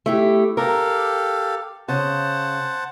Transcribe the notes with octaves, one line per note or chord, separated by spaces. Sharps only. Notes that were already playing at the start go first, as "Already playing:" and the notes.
A3 E4 G4
G4 A4 A#4 F5
C#3 C5 F#5 A5